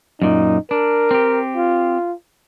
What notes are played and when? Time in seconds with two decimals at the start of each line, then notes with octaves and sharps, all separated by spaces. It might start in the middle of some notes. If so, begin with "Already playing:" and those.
0.22 F#2 A#2 D#4
0.71 D4 A#4
1.11 C4 G4
1.56 F4